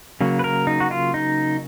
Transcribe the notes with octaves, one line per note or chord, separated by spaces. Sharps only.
C#3 F#3 A#3
B4
A#4
D#4
F#4
F4
D#4